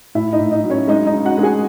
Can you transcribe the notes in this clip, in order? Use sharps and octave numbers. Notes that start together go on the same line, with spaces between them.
A2 E4 E5
D#4 D#5
A2
D#4 D#5
F#3
C#4 C#5
G#3 D#4 D#5
D#4 D#5
C#3
F#4 F#5
G#3
G#4 G#5